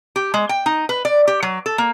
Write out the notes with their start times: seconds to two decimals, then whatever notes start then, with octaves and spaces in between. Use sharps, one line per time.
0.16 G4
0.34 G#3
0.49 G5
0.66 D#4
0.89 B4
1.05 D5
1.28 G4
1.43 F#3
1.66 A4
1.78 A#3